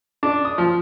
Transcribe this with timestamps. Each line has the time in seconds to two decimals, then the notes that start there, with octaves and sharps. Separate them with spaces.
0.23 D4
0.45 D#6
0.58 F3